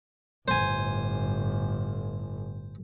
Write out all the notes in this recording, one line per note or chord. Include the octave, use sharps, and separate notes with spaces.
G1 A2 C5 G#5